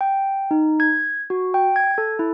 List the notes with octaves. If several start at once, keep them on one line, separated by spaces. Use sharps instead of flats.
G5
D#4
G#6
F#4
G5
G#6
A4
E4